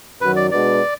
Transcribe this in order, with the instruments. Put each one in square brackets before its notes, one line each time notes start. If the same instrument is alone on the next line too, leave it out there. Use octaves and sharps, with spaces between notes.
[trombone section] F#2 D#3 F#3 [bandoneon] B4
[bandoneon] D5
[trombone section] B2 G#3 D4 F#4 B4 [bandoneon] D5